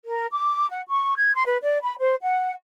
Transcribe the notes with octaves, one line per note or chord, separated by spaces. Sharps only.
A#4
D6
F#5
C#6
G#6
C6
B4
D5
B5
C5
F#5